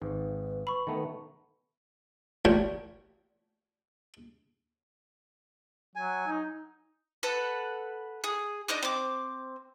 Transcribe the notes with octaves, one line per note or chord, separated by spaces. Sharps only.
G#1 G#2 B4
B5 C#6
D#3 A3 B3
A1 A#2 C#5 G5
F#3 G#5
D#4
A4 B4 F#5
G#4
D4 D#4 D#5 D6
C4 D6